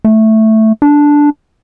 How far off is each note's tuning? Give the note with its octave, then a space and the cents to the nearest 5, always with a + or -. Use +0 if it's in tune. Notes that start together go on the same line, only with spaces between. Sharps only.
A3 +0
D4 -5